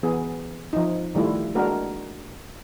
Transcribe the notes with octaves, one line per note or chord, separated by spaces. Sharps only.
E3 B3 G#4
F3 D#4
D#3 G3 A3 E4 F4
G#3 A#3 D4 F#4 A#4